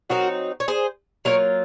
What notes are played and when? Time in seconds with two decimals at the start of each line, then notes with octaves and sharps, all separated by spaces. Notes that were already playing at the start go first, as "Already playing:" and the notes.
0.10 F#3 C4 D#4 F#4 A#4
0.60 C#5
0.68 G#4 C5
1.25 F#3 A#3 F4 A#4 C#5